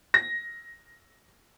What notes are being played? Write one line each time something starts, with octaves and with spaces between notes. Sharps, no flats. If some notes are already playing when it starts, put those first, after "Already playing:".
A#6